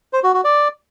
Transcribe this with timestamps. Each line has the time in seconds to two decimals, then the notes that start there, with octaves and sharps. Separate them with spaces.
0.13 C5
0.23 F#4
0.34 F#4
0.44 D5